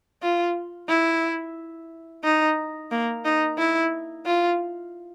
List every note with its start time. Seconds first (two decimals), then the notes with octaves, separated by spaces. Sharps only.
0.22 F4
0.89 E4
2.24 D#4
2.91 A#3
3.25 D#4
3.58 E4
4.26 F4